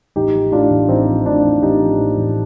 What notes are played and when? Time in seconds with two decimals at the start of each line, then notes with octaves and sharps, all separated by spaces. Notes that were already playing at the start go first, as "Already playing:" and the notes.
0.16 A1 D#4 G4
0.34 F3
0.52 A2 D4 F4
0.70 A1
0.88 A1 C4 D#4
1.07 F3
1.26 A2 D4 F4
1.44 A1
1.62 A1 D#4 G4
1.81 F3
1.99 A2
2.17 A1